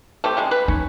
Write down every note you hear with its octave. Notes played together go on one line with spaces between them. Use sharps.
A3 C4 G4
C#3 G3 G#3
B4
C#4 D#4